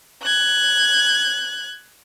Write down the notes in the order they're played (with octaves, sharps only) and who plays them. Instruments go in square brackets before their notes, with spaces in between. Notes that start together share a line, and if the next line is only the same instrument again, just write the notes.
[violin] F#6 G#6